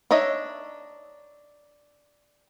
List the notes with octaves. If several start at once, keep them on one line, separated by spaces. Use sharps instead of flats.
D4 D#4 C#5 D#5 E5